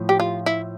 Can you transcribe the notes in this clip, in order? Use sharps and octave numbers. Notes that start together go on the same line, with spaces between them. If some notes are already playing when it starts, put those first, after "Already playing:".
Already playing: A2 F3
G4
F4
E4